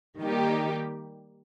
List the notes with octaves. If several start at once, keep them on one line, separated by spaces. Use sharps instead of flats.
D#3 G3 A#3 D#4 G4